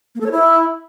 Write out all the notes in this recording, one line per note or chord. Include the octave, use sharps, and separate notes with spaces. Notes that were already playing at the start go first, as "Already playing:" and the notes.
A#3
A4
C#5
E4